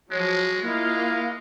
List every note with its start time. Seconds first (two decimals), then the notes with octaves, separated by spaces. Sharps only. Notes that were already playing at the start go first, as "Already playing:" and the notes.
0.11 F3 F#3 G#3 C#5
0.62 G#3 A#3 E4 F4 D#5 F5